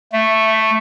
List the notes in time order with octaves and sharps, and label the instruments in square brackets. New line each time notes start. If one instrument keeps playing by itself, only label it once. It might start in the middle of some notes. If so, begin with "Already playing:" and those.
[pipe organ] A3 [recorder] E5